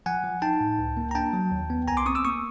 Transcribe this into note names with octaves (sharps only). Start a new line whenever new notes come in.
F3 F#5 G#5
F3
D#4 G5 A5
A2
C#2
A#3
A#5
D4 G5 A5
F#3
D#2
B3
C2 G#5 A#5
C6 D6
C4 C#6 D#6
D6 E6
A#3 C#6 D#6